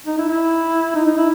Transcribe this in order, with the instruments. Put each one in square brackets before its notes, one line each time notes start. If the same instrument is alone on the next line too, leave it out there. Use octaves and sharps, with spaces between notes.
[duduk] D#4
E4
E4
D#4
D#4
E4